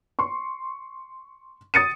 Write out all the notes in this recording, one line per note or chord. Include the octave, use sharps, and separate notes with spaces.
C6 C#6
D#6 A6 C#7 D#7